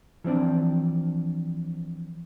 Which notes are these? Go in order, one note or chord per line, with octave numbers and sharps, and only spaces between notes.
E3 F3 C4 D4